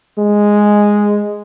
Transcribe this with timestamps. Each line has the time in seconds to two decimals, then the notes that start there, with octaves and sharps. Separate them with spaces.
0.18 G#3